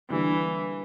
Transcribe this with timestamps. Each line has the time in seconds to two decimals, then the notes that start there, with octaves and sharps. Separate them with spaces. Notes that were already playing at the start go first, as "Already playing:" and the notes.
0.10 D3 E3 G3 A#3 D4